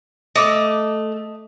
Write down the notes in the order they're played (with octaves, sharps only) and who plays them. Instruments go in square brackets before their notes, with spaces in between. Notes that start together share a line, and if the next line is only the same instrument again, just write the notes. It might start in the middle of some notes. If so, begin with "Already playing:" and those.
[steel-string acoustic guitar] A3 [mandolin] D#5 D6 E6